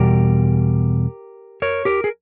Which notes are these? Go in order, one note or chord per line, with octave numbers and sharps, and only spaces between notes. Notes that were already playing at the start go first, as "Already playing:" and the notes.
Already playing: E2 B2 G3 G4 A#4
A#4 C#5
G4 A#4
G#4